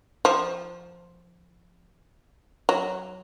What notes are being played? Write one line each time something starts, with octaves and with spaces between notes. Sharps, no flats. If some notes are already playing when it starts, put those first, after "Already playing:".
F3
F#3